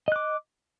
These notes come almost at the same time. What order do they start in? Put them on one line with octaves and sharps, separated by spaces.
D#5 F#6 D6